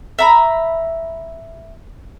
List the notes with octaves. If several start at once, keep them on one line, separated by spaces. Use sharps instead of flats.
E5 A#5 B5